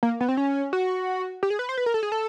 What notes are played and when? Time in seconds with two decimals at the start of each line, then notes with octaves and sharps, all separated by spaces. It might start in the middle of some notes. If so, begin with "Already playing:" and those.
0.03 A#3
0.21 B3
0.28 C4
0.37 C#4
0.73 F#4
1.43 G4
1.50 G#4
1.59 B4
1.69 C5
1.77 B4
1.86 A#4
1.94 A4
2.03 G#4
2.12 A4